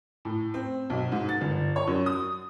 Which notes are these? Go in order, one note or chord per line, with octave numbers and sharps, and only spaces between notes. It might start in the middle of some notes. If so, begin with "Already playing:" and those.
A2
C4
B1
G#2
A6
G1
C#5
F#2
D#6